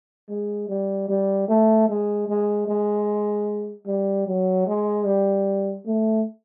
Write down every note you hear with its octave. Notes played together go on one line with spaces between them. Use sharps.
G#3
G3
G3
A3
G#3
G#3
G#3
G3
F#3
G#3
G3
A3